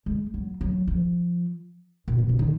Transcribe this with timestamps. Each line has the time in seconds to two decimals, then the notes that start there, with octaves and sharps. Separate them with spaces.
0.06 G#3
0.34 F#3
0.61 F#3
0.88 F3
2.08 A#2
2.18 B2
2.29 C#3
2.39 D#3